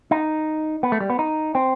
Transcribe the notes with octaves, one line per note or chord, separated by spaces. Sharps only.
D#4
B3
A3
G3
B3
D#4
C4